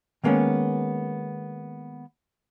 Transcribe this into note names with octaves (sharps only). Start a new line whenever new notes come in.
D#3 G#3 A#3 B3 C#4